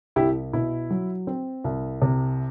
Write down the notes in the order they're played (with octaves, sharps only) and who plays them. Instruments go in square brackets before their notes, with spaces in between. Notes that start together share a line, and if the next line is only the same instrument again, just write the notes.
[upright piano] C2 E4 G4
B2 E4
F#3
C4
C2
C3